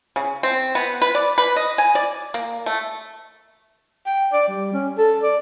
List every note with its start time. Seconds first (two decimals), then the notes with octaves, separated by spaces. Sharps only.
0.16 C#3
0.43 C4
0.75 B3
1.02 B4
1.15 D5
1.38 B4
1.56 D#5
1.78 G#5
1.95 D5
2.34 A#3
2.66 A3
4.06 G5
4.32 D5
4.48 G3
4.73 C#4
4.98 A4
5.23 D5